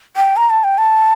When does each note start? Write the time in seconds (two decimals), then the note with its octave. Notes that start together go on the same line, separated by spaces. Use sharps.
0.16 G5
0.37 A#5
0.50 A5
0.64 G5
0.78 A5